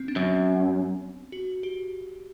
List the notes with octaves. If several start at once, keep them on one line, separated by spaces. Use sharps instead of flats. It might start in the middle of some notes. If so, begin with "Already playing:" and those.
Already playing: B3 C4
D4
F#2
F#4
G4